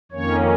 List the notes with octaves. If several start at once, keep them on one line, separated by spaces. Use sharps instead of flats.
F2 D#3 A#3 C#4 C#5